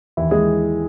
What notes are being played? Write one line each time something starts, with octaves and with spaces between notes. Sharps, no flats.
D#2 E3 E4
G#3 G#4
E3